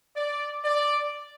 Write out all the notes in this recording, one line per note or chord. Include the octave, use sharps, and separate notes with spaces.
D5
D5